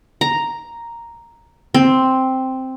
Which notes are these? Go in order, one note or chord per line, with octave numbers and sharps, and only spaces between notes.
A#5
C4